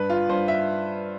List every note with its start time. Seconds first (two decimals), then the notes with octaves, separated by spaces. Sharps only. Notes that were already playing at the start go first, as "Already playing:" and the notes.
Already playing: G2 B4
0.10 F4
0.29 G2 C5
0.48 E5